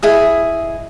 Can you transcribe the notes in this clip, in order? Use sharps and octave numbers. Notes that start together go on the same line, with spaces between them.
E4 G#4 D#5